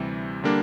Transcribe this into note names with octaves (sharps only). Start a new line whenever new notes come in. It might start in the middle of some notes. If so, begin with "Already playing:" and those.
Already playing: D2 C3 E3 G3
D3 G3 A#3 D4